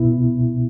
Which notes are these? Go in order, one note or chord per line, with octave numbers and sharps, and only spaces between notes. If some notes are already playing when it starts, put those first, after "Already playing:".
Already playing: C2 B2 B3 E4